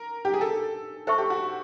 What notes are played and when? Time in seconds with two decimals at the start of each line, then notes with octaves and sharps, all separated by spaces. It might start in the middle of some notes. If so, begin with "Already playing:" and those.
Already playing: A#4
0.25 G4
0.34 G#4
0.41 A4
1.07 A4 C5 E5 A5 C#6
1.18 G4
1.30 F#4